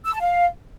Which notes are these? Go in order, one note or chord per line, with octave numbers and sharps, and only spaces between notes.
E6
A5
F5